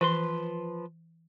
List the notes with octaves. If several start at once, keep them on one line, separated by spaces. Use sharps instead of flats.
E3 F3 B4 C6